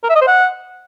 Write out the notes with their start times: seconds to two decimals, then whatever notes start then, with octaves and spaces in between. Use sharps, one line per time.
0.04 A#4
0.09 E5
0.15 D#5
0.21 C5
0.27 F#5